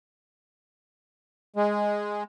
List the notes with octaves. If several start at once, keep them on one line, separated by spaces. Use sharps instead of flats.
G#3